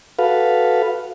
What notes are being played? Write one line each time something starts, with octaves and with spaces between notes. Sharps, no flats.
F#4 A4 B4 F5